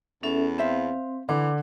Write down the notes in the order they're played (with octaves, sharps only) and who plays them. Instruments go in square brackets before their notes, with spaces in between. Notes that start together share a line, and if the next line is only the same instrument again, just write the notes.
[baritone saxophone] E2 [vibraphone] C#4 A4 E5
[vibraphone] C4 [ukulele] C5 E5 F5
[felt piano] D3 [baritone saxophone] E3 [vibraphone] D6